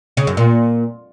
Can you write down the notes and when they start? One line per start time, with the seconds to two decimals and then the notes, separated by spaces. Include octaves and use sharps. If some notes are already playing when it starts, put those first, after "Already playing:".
0.17 C#3
0.27 F#2
0.37 A#2